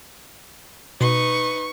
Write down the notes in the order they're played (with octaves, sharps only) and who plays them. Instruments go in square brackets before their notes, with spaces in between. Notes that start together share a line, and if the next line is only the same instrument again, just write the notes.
[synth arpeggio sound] B2 [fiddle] D#4 B4 [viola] C#6